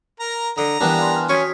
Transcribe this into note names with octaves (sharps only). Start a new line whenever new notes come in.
A#4 A#5
D3 D#5 A#5
E3 G3 B3 D4 A#4 B4 G5
F5 G#5 C6
F6
C#4 F#4 C#5 D#6 B6